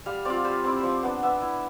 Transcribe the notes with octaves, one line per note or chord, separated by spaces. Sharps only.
G3 F5
C4 F4 D5
G3 C5
C4 E4 D5
F3 C5 D5
B3 D4
B3 E5
E4